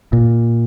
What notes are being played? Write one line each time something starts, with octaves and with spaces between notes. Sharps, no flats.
A#2